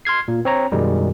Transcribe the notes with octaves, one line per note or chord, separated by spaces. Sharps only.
C6 F6 G#6 C7
A#2
C4 C#5 A#5
F#2 B2 D#3 G3 G#3